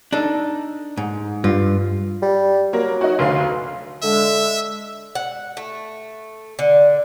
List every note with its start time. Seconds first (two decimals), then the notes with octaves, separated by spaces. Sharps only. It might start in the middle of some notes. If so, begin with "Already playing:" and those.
0.13 D4 D#4 A4
0.97 G#2
1.44 G2 F4
2.22 G3
2.73 F#3 A#3
3.01 D#4 F#4
3.19 F1 D2 F5
4.02 D3 G#3 E5
5.15 F#5
5.57 A3
6.59 D3